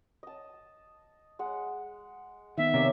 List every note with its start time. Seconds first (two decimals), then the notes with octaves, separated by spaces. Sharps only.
0.23 D#5 A5
1.39 G#3 F#5
2.58 D#3 B3 E5
2.74 C3 A#3 C#4 D5